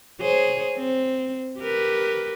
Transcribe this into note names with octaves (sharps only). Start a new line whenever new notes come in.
G#4 C5 C#5
C4
G4 A#4 B4